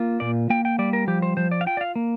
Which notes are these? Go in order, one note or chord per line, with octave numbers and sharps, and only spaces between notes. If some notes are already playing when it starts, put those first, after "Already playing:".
Already playing: A#3 F4
A#2 D5
A#3 G5
G5
G3 D5
A#4
F3 G4
C5
F3 C5
D5
F5
F4 G5
D5
F5
A#3